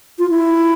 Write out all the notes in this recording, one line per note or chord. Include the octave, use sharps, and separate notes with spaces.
F4
E4